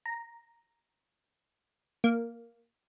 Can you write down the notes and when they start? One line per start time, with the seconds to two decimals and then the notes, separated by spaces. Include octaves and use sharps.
0.06 A#5
2.04 A#3